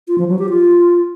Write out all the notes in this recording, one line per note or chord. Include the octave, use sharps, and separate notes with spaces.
F4
F3
F#3
G4
F4